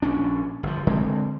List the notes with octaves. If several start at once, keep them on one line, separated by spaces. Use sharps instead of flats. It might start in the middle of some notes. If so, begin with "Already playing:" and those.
A#1 C#4 D4
G1 F3
D3 G#3 C4